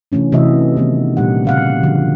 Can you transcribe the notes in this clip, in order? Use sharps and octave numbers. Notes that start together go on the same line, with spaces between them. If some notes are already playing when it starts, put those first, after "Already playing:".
C3 E3 A3 C#4 D4
C3 E3 A3 F#4 D#5 E5
D#3 E3 A3 B3
A#2 G3 D4 G4 F#5
C#3 F5 F#5
D3 F3 F#4